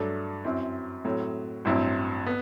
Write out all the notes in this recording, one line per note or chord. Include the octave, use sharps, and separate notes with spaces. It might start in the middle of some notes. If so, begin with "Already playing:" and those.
Already playing: G2 F#3 A3 D4
F#2 F#3 C4 E4
A2 F#3 C4
A1 G2 F#3 C4 E4
B3